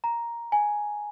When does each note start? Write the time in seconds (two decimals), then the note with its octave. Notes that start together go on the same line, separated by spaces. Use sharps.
0.04 A#5
0.52 G#5